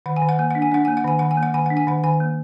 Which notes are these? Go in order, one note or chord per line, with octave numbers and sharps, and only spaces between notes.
D#3 F#5
G#5
D#3
F#5
A#3 G#5
D4 F#5
G#5
D4 F#5
A#3 G#5
F#5
D#3 G#5
D#3 F#5
G#5
A#3
F#5
D#3 G#5
D4 F#5
G#5
D#3 F#5
D#3 G#5
A#3